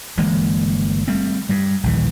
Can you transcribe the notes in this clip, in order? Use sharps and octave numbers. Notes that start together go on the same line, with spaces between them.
G1 E3 G#3 A#3
G3 A3 C4
G2 G3
A#1 D#2 E3